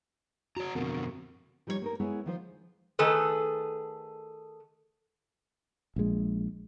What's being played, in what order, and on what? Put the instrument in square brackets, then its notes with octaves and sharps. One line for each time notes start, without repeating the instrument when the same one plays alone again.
[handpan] F#4 [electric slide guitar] C#5 A5 A#5
[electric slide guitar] F2 B2 D3 [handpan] B3 C4 A#4
[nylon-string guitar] F3 G3 D#4 E4 C#5
A#3 D#4 A#4
G#3 B3 E4 G#4 C#5
D#3 F3 C5
[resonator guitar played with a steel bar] D#3 A3 G#4 A4 B4
[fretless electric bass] A#1 G#3